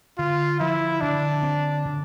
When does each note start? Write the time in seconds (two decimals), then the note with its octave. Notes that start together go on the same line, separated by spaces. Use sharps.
0.18 D3 F4
0.60 F3 E4
1.01 D3 D4
1.43 C4
1.85 D3